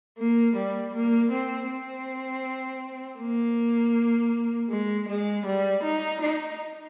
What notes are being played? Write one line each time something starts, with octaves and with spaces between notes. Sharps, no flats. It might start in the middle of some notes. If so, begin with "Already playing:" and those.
A#3
G3
A#3
C4
C4
A#3
G#3
G#3
G3
D#4
D#4